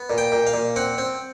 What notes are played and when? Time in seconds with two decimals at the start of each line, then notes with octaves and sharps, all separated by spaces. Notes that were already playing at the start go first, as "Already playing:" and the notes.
Already playing: B3
0.10 A#2
0.18 G5
0.32 A#2
0.47 F5
0.54 A#2
0.76 C4 F#5
0.98 C4